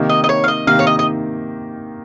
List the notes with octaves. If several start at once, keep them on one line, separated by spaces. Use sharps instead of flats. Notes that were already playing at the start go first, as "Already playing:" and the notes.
Already playing: C3 D#3 A#3 D#4
D#5
D#5
C#5
F5
D#5
C3 D#3 A#3 D#4 F5
C#5
D#5
D#5